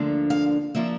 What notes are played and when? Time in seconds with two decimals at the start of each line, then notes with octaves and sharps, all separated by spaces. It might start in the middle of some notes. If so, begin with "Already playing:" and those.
Already playing: D2 D3 F3 A#3 D4
0.30 F5
0.75 D3 F3 A#3 D4 E5